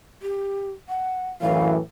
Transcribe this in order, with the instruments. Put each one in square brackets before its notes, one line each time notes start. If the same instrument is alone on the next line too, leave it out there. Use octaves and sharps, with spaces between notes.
[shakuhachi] G4
F#5
[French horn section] F#2 A2 E3 [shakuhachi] F5